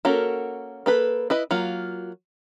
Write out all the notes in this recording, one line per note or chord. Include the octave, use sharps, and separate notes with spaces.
A#3 C#4 F#4 A4 A#4
A#3 A4 B4
E4 B4 D#5
F#3 A#3 F4